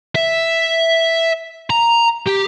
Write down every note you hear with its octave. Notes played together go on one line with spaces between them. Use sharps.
E5
A#5
G4